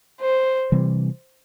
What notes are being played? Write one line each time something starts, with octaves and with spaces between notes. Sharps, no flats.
C5
C3 E3 G3 C4